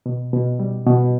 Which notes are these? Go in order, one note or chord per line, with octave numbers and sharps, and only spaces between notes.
B2
B2
G3
B2